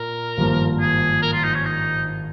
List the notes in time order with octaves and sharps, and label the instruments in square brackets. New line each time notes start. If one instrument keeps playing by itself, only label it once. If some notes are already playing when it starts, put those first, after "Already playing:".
Already playing: [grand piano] A#2 [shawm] A#4
[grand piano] G#1 G2 F3 A#3
[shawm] G#4
A#4
F4
D#4
C#4
D#4